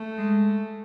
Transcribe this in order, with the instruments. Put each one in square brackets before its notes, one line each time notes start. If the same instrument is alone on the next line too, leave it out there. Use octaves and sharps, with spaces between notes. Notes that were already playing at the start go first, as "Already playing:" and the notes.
Already playing: [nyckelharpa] A3
[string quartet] G#3